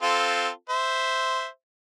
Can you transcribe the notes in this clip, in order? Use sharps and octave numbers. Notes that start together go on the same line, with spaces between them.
C4 F4 A4
C5 E5